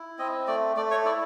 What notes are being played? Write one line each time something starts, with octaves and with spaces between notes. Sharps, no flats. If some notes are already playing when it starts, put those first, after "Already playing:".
Already playing: E4
C4 D#5
A3 D5
A3 D5
C#5
E4 D5